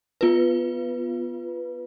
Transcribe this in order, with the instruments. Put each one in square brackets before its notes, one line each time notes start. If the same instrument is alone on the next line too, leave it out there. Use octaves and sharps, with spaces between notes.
[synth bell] B3 F4 B4